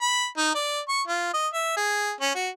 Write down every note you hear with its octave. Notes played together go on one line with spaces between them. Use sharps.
B5
D#4
D5
C#6
F4
D#5
E5
G#4
C#4
F#4